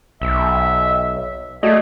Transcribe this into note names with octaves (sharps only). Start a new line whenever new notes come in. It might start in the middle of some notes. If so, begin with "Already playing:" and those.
B1 E5
A3 F#4 G#4 D5 D#5